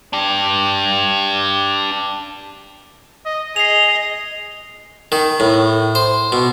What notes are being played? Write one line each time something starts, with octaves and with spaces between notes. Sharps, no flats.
D4 G4
D#5
G#4 D#5 C7 F7
D#3
A2
C5
B2